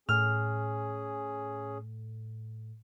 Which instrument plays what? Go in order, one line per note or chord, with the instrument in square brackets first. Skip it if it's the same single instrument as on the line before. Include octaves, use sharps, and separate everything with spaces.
[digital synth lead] A2 [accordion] C#4 G#4 [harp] F6